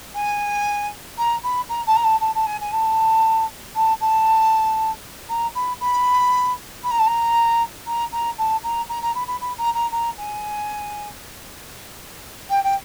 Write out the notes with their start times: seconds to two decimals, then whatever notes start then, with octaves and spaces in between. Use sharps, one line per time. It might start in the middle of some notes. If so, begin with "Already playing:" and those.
0.15 G#5
1.18 A#5
1.43 B5
1.69 A#5
1.87 A5
1.96 A#5
2.04 A5
2.21 A5
2.35 A5
2.46 G#5
2.61 G#5
2.72 A5
3.75 A5
4.01 A5
5.29 A#5
5.55 B5
5.81 B5
6.84 B5
6.91 A#5
6.99 A5
7.07 A#5
7.87 A#5
8.12 A#5
8.38 A5
8.64 A#5
8.89 A#5
9.02 A#5
9.15 B5
9.28 B5
9.41 B5
9.58 A#5
9.75 A#5
9.92 A#5
10.18 G#5
12.50 G5
12.64 G5